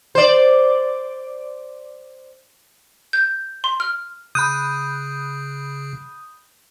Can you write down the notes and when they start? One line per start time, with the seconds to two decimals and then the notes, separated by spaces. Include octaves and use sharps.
0.15 C5 D5
3.13 G6
3.64 C6
3.80 F6
4.35 C#3 B5 D#6 F#6 G6